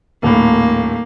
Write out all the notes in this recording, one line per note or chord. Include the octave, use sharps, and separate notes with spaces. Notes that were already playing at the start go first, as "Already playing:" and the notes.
D#1 A2 A#3